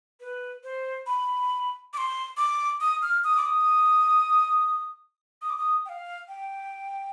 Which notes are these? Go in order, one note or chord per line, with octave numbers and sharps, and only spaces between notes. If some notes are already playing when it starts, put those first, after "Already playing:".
B4
C5
B5
D6
C6
D6
D#6
F6
D#6
D6
D#6
D#6
D6
D#6
G5
F5
G5